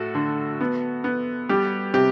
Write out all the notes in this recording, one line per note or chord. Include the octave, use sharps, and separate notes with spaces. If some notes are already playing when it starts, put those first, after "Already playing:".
Already playing: A2 A3 F#4 A4
D3
B3
B3
G3 G4
C3 G4